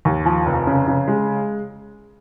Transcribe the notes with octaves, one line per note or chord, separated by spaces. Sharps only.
D#2
F3
F1
C#3
C#3
G#3